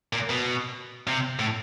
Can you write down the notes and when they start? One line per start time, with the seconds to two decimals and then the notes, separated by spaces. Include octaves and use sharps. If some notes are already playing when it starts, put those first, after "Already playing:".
0.13 A#2
0.29 B2
1.07 C3
1.39 A2